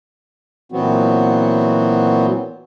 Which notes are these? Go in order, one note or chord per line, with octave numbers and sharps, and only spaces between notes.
A#2 E3 F#3 B3 C4 F#4